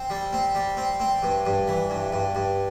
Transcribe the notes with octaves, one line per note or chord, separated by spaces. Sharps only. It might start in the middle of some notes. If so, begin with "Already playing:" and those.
Already playing: C4
G3
C4
G3
C4
C4
G2
G2
E3
G2
G2
G2